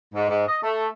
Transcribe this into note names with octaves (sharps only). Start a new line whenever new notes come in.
G#2
G#2
D#5
A3